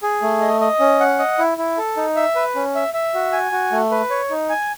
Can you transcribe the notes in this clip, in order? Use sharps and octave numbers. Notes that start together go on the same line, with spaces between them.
G#4
A3
D#5
D#5
C#4
F#5
D#5
E4
E4
A4
D#4
E5
B4
C#4
E5
E5
F#4
G#5
F#4
A3
B4
C#5
D#4
G#5